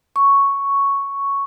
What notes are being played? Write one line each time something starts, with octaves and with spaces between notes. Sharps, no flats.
C#6